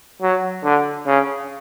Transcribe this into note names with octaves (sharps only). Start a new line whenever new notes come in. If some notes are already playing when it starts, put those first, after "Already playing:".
F#3
D3
C#3